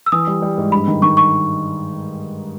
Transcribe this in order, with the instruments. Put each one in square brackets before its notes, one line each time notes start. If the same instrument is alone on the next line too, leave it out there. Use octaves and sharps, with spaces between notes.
[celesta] E6
[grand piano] E3 [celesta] D#6
[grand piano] G3
G3
G#2
[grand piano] G2 [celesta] B5
[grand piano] D#3
[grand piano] D#3 [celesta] C#6
[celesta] C#6